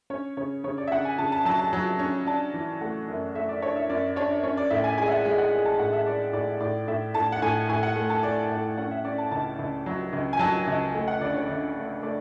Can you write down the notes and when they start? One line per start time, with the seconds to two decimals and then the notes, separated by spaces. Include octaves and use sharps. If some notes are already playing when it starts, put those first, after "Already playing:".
0.10 C#4 C#5
0.37 C#3 C#5
0.64 C#3 C#5
0.78 D5
0.87 E5
0.91 C#3 F#5
1.05 G#5
1.18 C#3 A5
1.32 A5
1.45 F#3 A5
1.59 A5
1.73 F#3
1.99 C#4
2.27 D4 A5
2.54 E3
2.81 A3 F#5
3.08 F#2
3.35 A3 E5
3.49 D5
3.62 D4 C#5
3.76 E5
3.89 F#2 D5
4.16 D4 C#5
4.43 C#4 C#5
4.57 D5
4.70 A2 E5
4.84 G#5
4.97 G#3 G#5
5.07 E5
5.11 F#5
5.25 G#3 E5
5.38 F#5
5.53 G#3
5.65 A5
5.79 A2 F#5
5.93 E5
6.06 G#3 D5
6.33 A2 D5
6.60 A2 D5
6.88 A2 E5
7.14 A2 A5
7.32 F#5
7.42 A2 G#5
7.69 A2 G#5
7.83 F#5
7.96 A3
8.10 A5
8.23 A3 D5
8.51 A2
8.78 C#4 F#5
8.91 E5
9.05 C#4 D5
9.18 A5
9.31 C#2 A5
9.59 C#2
9.86 F#3
10.13 C#2
10.33 G#5
10.39 F#3 A5
10.68 C#2
10.94 A3
11.08 F#5
11.21 D2 D5
11.34 C#5
11.48 D2
11.75 A3
12.03 A3 D5